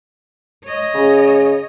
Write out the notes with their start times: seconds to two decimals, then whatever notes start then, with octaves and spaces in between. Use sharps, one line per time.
0.64 C#5 D#5
0.95 C#3